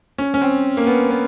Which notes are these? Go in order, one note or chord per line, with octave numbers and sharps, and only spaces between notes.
C#4
C#4
C4
A#3
B3
B3